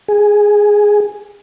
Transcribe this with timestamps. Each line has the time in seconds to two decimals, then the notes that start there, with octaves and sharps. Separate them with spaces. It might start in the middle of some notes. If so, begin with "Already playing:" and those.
0.08 G#4